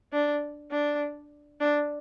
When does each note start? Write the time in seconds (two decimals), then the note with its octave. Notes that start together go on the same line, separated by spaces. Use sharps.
0.12 D4
0.71 D4
1.60 D4